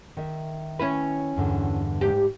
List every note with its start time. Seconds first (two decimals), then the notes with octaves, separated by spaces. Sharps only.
0.17 D#3 E5
0.79 C#4 E4 B4
1.36 E2 G2 D3
2.01 G#2 G4